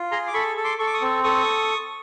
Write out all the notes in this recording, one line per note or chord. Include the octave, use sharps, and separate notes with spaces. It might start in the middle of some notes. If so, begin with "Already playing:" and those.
Already playing: F4
G#4 A#5 C6
D6
A4 B5 C#6
A4
C6 D6
A4 C#6
D6
C#6 D#6
C4
A4 C#6 D#6